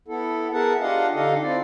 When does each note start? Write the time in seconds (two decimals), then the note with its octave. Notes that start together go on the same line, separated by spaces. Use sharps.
0.08 B3 E4 A4
0.53 B3 G#4 A#4 E5 F#5 A5
0.81 D4 F4 G4 D#5 F5 F#5
1.14 D3 D#4 G4 A4 D#5 F5
1.42 C4 E4 F4 D5